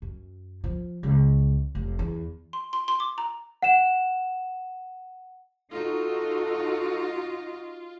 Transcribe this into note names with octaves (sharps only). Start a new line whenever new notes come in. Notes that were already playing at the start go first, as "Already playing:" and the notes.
F#2
F3
C#2
F1
E2
C6
C6
C6
D6
A#5
F#5 E7
D#4 F4 F#4 A4 D#5